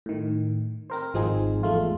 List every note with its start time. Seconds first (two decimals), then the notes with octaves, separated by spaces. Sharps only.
0.06 A2 D#3
0.90 C4 A#4 C5
1.14 G#1 F3 G#3 C4 D#4 G#4
1.63 E2 G#3 A3 F4